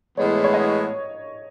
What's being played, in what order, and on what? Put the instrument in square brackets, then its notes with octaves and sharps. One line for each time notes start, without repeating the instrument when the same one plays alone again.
[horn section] A2 E3 G#3 B3 [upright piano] C#5
[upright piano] C#5
D#5